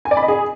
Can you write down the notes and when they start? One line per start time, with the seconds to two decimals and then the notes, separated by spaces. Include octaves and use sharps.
0.05 G#5
0.11 D5
0.17 B5
0.23 D#5
0.28 G#4